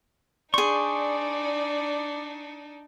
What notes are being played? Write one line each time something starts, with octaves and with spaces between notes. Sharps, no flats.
D4 D#4 G#4 C5 D5 C#6